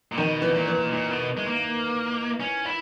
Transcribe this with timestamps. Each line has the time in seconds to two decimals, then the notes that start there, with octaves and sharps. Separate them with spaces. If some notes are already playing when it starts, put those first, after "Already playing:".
0.12 A#2
0.17 B2 D#3
0.42 E3
0.54 A#2
0.68 E3
0.92 A#2
1.11 B2
1.37 G#3
1.47 A#3
2.40 C#4
2.65 E4